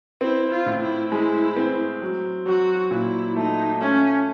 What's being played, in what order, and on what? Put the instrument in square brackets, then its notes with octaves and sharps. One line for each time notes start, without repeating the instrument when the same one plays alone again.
[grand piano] C4 [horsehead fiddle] E4
[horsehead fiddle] F4
[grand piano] A2
[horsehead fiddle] E4
[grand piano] G#3 [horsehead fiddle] E4
[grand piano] C4
F#3
[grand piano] F#3 [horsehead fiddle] F#4
[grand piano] A#2 [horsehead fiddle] E4
[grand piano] A3 [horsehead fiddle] D#4
[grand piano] A3 [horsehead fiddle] C#4